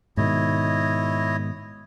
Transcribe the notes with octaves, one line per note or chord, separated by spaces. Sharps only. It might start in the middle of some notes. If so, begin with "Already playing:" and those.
G#2 B2 D#3 E4 C#5 D#5